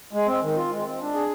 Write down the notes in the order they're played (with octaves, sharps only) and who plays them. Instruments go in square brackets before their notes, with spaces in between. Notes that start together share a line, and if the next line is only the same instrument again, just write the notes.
[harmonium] G#3
C4
D#3
F4
G#3
C4
D4
G#4